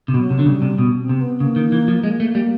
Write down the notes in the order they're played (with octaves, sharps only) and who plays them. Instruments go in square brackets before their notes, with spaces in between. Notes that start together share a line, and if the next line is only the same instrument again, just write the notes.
[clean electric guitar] C3
[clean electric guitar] B2 [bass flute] F#3
[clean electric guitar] C3
D3
[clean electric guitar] C#3 [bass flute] G3
[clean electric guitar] C3
B2
[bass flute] C4
[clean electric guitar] C3
[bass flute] B3
[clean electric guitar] C#3 [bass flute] A#3
[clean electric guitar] D#3
E3
F3
[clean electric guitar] G#3 [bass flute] A#3
[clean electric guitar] A3
G3